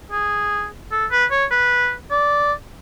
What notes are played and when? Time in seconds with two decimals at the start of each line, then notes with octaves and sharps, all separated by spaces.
0.11 G#4
0.92 A4
1.11 B4
1.31 C#5
1.51 B4
2.11 D5